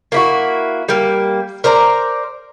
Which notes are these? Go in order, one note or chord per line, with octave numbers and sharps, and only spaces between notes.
A#3 E4 F#4
G3 A#3
A#4 C5 D5 A#5